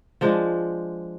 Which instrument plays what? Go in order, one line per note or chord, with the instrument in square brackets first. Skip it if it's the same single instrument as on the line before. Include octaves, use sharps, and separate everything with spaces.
[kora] F3 G#3 D4